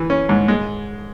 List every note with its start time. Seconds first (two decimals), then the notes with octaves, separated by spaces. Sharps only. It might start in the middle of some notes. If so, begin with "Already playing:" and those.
Already playing: E3
0.10 C#4
0.29 G#2
0.48 G#3